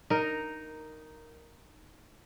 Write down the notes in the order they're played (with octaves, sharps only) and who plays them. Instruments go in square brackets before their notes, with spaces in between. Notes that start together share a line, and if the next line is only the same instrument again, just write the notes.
[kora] D#4 A#4